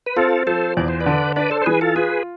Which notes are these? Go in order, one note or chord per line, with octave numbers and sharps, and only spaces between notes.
B4
C4 F4 A4
F3 A4 C5
E2 D5
C5
B4 D5
D3
D4 B4 D5
A4 C5
C5
E3 G#4 B4
F4 A4
F4 G#4 B4